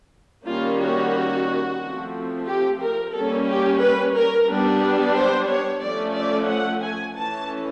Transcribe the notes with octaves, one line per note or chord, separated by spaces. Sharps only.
D#3 G3 A#3 C#4 F4
F#4
F3 A3 C4
G4
A#4
G3 A#3 C#4 A4
G4
B4
A#4
G3 B3 D4
C5
C#5
F3 A3 C#4 D5
D5
F#5
G#5
E3 A3 C#4 A5